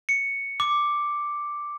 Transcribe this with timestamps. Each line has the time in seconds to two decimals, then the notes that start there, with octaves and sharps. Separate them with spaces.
0.09 C#7
0.60 D6